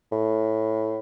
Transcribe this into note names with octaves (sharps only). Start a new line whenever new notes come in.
A2